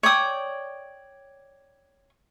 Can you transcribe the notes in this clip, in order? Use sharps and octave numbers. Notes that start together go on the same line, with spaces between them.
C#5 D5 G5 D#6